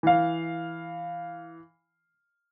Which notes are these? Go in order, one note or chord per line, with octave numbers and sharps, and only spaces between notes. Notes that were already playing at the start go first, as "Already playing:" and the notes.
E3 F5